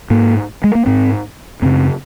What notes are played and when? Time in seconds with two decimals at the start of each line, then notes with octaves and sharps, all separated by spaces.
0.10 G#2 A#3
0.64 G#3
0.75 A#3
0.86 G#2 C4
1.62 F#2 C#3 C4